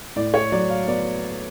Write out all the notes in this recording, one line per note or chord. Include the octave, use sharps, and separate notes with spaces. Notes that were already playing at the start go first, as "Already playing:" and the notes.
A2 D5
C#5
F#3 D5
F5
B3 D5